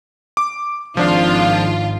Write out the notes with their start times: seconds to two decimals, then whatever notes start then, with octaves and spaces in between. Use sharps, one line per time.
0.37 D6
0.97 G#1 F3 D4 F4 F5